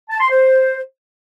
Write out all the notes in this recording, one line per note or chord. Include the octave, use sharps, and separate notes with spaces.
A5
C6
C5